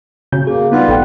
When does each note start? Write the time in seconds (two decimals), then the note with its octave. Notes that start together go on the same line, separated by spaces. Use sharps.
0.32 C#3 F#4 G6
0.47 A#3 G#4
0.72 G3 B3 D#4 F4 B4 F#5
0.88 A1 A4 G5